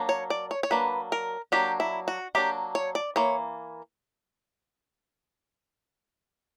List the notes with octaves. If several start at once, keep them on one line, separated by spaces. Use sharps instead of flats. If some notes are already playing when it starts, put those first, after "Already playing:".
Already playing: F#3 A#3 D4
C#5
D5
C#5
C#5
F#3 A#3 D4 B4
A#4
F#3 A#3 D4 G4
E4
F#4
F#3 A#3 D4 G4
C#5
D5
E3 A#3 C#5